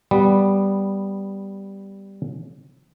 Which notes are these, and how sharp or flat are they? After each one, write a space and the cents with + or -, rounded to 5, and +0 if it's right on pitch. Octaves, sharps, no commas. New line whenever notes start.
G3 +0 B3 +0